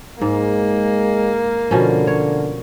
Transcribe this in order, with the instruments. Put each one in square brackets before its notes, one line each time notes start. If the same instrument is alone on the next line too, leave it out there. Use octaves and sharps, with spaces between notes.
[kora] G#2 [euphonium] G#3 [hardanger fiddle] A#3
[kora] B2 F3 C#4 [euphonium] D3
[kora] C#5